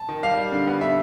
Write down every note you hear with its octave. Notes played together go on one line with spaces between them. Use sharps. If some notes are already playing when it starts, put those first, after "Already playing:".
Already playing: A5
D#3
G3 F5
G3
D3
B3
D3 E5